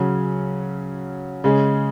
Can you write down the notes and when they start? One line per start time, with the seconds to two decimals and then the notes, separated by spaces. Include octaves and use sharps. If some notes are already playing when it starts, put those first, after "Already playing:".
Already playing: C#3 F#3 C#4
1.44 C#3 G#3 C#4